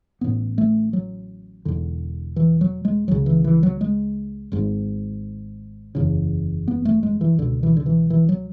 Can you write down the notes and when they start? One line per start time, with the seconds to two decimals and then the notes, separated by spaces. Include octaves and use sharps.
0.21 A1 A2 B3
0.58 A3
0.93 F#3
1.65 E1 E2 D3
2.36 E3
2.61 F#3
2.85 G#3
3.08 C#2 C#3 F#3
3.26 E3
3.44 E3
3.63 F#3
3.81 G#3
4.52 G#1 G#2
5.95 F#1 E2 C#3
6.68 B3
6.85 A3
7.03 G#3
7.21 E3
7.38 C#2 B2 D3
7.63 E3
7.77 D3
7.86 E3
8.10 E3
8.29 F#3